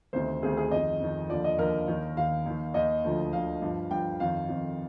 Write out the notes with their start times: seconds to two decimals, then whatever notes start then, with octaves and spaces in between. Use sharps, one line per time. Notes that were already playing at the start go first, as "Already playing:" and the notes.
0.13 D2 C3 D#3 C5
0.43 D2 C3 D#3 G#4
0.57 G#4
0.71 F2 D#3 D#5
1.00 F2 D#3
1.29 D#2 D3 F3 D5
1.44 D#5
1.58 D#2 D3 F3 A#4
1.87 D#2 D#3
2.17 D#2 D#3 F5
2.46 D#2 D#3
2.74 D#2 D#3 D#5
3.04 D2 D3 F3
3.33 D2 D3 F3 F5
3.62 G2 F3
3.91 G2 F3 G5
4.20 F2 D#3 F5
4.49 F2 D#3